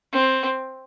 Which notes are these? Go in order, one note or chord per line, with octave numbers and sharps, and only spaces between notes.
C4